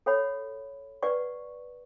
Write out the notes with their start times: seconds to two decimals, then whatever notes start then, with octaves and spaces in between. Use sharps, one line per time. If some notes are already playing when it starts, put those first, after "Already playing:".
0.06 A4 C#5 F#5 B5
1.03 B4 D5 F#5 C#6